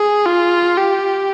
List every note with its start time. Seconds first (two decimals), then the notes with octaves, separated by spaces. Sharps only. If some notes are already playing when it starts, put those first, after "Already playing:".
Already playing: G#4
0.26 F4
0.77 G4